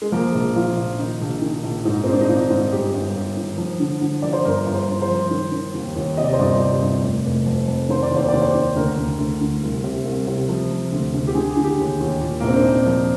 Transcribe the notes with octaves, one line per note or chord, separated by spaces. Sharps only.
G#3
F3 A#3
A#1
F3 F4
A#1
D#3 D#4
A#1
D#3
A#1
G#2 D#4
G#2 C4
D4
D#4
D#3 F4
G#2
G1 G4
G1
G1
D#3
F3
D3
D3
F3 D5
C5
G1 A#4
G1
C5
G1
C5
F3
D#3
D#3
D#2
D#2
C3 D#5
D5
C5
G1 D5
C3
G1
F1
F1
F2
F2
D#3 C5
D5
D#2
C5
D#2 D5
C5
D#3
D2 A#4
D2
D2
D3
C2
C3
C2
C3
F3
F3
D2
D2
G4
D3 G#4
D3
G4
D#2
D#2
A#2
A#3
A#1 C4
D4
A#1 D#4
F3